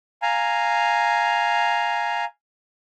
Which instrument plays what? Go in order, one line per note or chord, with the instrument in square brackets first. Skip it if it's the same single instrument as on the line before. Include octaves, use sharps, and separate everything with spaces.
[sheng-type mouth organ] F5 G#5 A#5